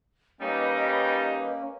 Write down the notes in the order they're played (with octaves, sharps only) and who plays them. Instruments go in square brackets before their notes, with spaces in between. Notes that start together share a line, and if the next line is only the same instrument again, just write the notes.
[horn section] G3 D#4 [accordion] A#3 C#4 [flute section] B4 D#5